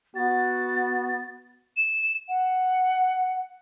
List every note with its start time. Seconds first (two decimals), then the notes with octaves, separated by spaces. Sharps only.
0.16 B3 F#4 A6
1.77 E7
2.29 F#5